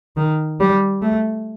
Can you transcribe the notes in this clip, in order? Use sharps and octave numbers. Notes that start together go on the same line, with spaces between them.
D#3
G3
A3